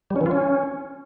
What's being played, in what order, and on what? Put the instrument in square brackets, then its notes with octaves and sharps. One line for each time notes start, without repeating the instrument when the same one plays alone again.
[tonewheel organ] G3
C#4
E3
F4
C#4